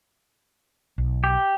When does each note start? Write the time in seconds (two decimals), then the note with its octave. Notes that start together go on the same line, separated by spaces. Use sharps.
0.98 B1
1.24 G4